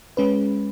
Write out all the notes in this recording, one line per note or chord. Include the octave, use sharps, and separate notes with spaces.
G#3 C#4 B4